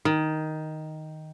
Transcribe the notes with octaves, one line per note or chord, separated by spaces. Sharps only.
D#3